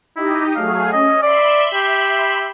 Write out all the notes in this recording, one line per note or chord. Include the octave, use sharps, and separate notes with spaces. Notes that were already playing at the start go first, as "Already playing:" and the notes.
D#4 E4 G4 D#5
F#3 A3 G#4 F5
C#4 D#5
D5 E5 B5 C6
G4